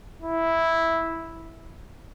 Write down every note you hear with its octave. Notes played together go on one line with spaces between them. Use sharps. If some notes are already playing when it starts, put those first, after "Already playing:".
E4